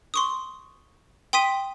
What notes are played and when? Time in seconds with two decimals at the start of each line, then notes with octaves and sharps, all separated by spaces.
0.14 C6 C#6 D#6
1.33 G5 C6 D#6 B6 D#7